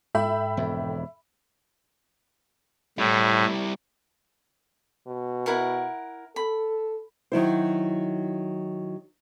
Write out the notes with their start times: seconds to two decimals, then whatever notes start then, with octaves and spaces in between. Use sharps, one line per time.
0.15 G#2 A4 E5 G5 B5
0.57 E1 F2
2.98 A2 G3 E4
5.07 B2
5.46 E4 A#4 F#5
6.36 A4 B5
7.32 D#3 F#3 E4 C5